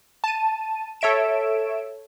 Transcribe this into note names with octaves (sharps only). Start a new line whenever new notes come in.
A5 D#7
A4 C#5 E5 D7 E7